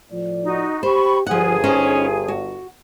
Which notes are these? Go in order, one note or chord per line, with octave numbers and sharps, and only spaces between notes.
A2 F3 D5
D#4 F#4
G4 C5 B5 C#6
G1 G2 F3 G#4 F#5
C#4 D#4 C5
F#4